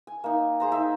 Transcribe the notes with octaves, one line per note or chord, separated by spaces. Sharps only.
G#5
A#3 D#4
G#4 C5 A#5
D#4 G#4 E5 G5